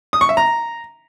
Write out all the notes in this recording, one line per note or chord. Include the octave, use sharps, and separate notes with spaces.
D#6
C#6
E5
A#5